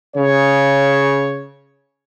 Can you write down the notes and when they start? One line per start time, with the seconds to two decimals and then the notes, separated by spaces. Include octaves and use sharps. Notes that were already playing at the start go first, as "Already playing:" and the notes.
0.15 C#3 C#5